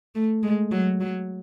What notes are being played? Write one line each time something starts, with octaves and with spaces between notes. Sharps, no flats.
A3
G#3
F#3
F#3